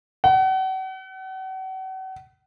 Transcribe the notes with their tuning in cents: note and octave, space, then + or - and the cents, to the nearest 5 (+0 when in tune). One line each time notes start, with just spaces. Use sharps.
F#5 +40